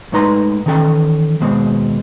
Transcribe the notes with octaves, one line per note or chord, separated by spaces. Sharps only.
A2 G#3 D#4 B4 A#5 C6
D#3 E3 C#4 A4 G5
D#2 B2 G#3 C4